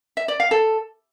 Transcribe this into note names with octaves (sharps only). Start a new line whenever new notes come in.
E5
D5
F5
A4